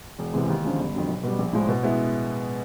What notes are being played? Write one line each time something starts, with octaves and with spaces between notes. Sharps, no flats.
E1
E2 C3 E3 G#3
D#2
D3 F3 G#3 C#4
G1
F2 D3 F#3
B1
B2 G3
A#1
A2 F3 G#3
B2
G#3 B3 E4